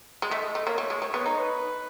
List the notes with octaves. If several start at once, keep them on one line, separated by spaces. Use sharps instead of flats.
G#3
A3 D#5
A3
A#3 C#5
A3
G#3
A3 C#5
B3
D#4
B4